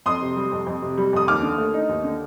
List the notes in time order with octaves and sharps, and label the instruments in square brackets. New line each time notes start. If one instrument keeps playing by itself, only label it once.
[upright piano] F2 C6 D#6
C3
G3
F2
F2
C3
G3
F2 D#6
D#2 D6 F6
D3
A3
D#4
D#2
D3